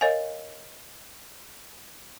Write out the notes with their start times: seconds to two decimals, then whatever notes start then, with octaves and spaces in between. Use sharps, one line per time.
0.01 A#4 C#5 D#5 F5 G#5